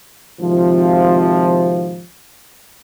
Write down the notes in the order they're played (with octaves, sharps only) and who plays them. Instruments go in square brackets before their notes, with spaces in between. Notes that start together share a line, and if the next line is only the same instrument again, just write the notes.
[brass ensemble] G#1 C3 F3